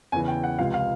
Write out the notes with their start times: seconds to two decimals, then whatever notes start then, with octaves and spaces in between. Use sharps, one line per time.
0.12 E2 C#3 E3 G#5
0.28 G5
0.44 F#5
0.59 C#2 C3 F3 F5
0.74 F5